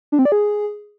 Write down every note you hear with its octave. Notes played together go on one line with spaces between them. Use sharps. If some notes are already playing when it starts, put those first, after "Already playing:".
D4
C4
D5
G#4